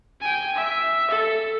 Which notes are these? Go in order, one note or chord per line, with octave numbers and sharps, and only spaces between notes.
G5 G#5
E5
A4